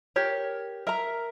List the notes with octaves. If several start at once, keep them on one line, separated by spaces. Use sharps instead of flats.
G4 A#4 C#5
A#4 E5 A#5